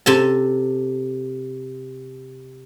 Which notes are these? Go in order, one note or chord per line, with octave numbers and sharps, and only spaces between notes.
C3 A4 A5